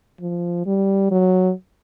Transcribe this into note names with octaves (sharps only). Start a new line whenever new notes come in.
F3
G3
F#3